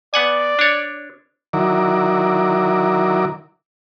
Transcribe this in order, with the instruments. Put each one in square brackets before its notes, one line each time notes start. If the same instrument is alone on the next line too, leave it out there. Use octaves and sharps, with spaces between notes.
[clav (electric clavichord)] B3 F#5 G#5 [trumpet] D5
[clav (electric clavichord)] D4 C#5
[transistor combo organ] D#3 F#3 E4 A#4 D5